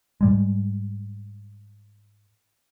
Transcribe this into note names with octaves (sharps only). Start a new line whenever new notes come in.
G#2 G3 G#3